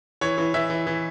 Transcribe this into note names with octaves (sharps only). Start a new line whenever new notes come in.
E3 C#5
E3
E3 E5
E3
E3